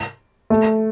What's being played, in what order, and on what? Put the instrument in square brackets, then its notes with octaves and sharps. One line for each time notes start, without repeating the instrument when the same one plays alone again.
[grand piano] A3